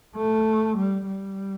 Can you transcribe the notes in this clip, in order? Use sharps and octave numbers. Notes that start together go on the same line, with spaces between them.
A3
G3
G3